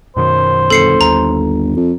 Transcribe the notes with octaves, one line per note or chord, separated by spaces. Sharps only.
F#2 B2 D#3 C5
G1 A4 C7 C#7
D#2 A#5
F2